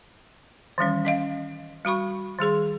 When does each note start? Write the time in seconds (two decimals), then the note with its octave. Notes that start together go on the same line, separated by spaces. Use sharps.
0.78 D#3 E3 G3 C#4
1.05 C#4 D#5 F5
1.85 G3 F#4 B5 C#6
2.39 D#3 G3 G#4 C6